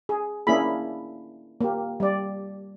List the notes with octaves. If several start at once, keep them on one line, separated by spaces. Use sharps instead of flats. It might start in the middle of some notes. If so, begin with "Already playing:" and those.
G#4
A#3 C#4 D4 E4 G#4 B5
A#3 G4
G3 D5